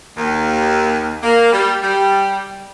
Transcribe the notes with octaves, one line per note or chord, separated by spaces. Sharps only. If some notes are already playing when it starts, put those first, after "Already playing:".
D#2
A#3
G3
G3